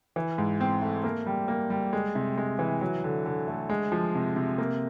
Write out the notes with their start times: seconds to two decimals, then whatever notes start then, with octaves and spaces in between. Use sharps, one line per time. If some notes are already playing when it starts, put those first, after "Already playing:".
0.16 E3
0.38 G#2
0.60 C4
0.82 A3
1.04 A#3
1.27 G3
1.48 A#3
1.70 G3
1.93 G#3
2.15 C3
2.37 G#3
2.59 E3
2.81 F#3
3.04 D3
3.26 D3
3.48 A3
3.70 G#3
3.92 F3
4.15 C3
4.36 C3
4.58 A#3